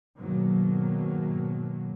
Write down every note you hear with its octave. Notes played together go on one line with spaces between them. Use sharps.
G#2 B2 D#3 F#3 A#3